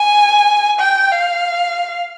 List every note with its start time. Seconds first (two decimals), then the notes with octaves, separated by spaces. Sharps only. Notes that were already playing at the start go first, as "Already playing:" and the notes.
Already playing: G#5
0.80 G5
1.11 F5